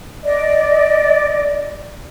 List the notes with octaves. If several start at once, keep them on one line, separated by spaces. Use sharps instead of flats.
D5 D#5